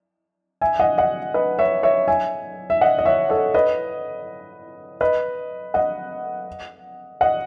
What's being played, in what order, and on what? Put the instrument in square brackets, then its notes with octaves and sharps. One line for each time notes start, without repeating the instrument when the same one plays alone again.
[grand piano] E5 G#5
D#5 F#5
D#5 F#5
B4 D#5
C#5 E5
C#5 E5
E5 G#5
E5
D#5 F#5
D#5
C#5 E5
A4 C#5
B4 D#5
B4 D#5
D#5 F#5
D#5 F#5